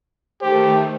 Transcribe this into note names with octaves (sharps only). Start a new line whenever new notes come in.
D#3 A3 G4 C5